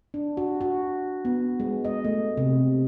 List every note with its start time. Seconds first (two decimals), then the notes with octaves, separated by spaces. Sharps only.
0.14 D4
0.37 F#4
0.61 F#4
1.25 B3
1.60 G#3
1.85 D#5
2.05 A3
2.37 C3